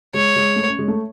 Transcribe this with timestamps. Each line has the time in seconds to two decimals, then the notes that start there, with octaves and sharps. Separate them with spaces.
0.14 G#3 C#5
0.36 G#3
0.56 A3
0.68 C#4
0.79 G#3
0.88 A3